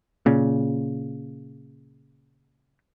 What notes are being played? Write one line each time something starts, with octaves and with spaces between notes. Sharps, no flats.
A#2 C#3